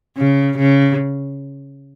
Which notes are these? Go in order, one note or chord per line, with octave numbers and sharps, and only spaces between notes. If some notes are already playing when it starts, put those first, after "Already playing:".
C#3
C#3